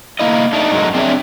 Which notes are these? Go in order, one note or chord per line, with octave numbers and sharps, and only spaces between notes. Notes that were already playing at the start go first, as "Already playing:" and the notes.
A#3 E4 D#5
A3 D4 D#4
F#2 F#3 G#3 D#4
C4 D4 G#4 A#4 C#5 E5